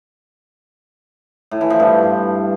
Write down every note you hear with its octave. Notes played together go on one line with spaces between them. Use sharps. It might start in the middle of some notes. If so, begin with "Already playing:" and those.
A2
E3
F3
G2